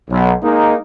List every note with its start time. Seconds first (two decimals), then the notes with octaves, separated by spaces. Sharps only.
0.10 B1
0.43 G#3 A#3 D#4